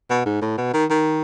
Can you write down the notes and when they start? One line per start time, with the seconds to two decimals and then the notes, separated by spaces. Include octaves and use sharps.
0.10 B2
0.26 G#2
0.42 A2
0.58 B2
0.74 D#3
0.90 D#3